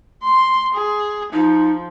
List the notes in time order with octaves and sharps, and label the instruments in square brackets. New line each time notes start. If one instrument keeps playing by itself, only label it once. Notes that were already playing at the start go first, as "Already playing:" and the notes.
[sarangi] C6
G#4
[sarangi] F3 [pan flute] D#4